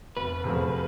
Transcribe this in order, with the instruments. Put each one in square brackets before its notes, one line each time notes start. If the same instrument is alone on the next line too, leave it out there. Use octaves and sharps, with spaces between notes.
[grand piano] F1 [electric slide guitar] B4
[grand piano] E2 C3 F3 A3